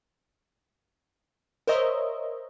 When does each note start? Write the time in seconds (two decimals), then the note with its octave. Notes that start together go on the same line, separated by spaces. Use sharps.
1.67 A#4 C5 C#5 D#5 E5